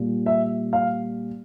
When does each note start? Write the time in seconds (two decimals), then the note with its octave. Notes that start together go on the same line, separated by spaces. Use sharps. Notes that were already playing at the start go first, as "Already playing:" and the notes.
Already playing: A#2 G3
0.26 E5
0.73 F5